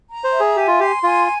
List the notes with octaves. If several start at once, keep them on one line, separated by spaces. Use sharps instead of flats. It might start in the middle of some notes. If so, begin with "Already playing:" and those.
A#5
C5
E5
G#4
G4 G#5
F4
G4 C6
F4 G#5